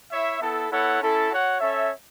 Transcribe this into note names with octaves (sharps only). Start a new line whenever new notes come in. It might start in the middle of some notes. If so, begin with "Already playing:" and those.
E4 C#5 E5
B3 E4 A4
B3 E4 A4 C#5 F#5
C#4 E4 A4
F#4 C#5 F#5
C#4 A4 C#5 E5